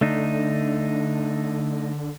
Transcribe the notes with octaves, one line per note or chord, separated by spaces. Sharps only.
D3 A3 D4 D#4